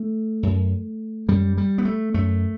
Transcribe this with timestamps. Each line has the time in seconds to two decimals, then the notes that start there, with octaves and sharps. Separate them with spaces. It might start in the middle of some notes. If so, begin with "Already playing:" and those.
Already playing: A3
0.43 F#2
1.28 F#2 G3
1.58 G3
1.78 B3
1.85 A3
2.14 F#2 A3